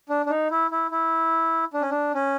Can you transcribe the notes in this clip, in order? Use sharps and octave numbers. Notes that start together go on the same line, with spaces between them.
D4
D4
D#4
E4
E4
E4
D4
C#4
D4
C#4